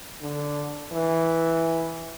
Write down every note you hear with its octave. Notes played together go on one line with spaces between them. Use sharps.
D3
E3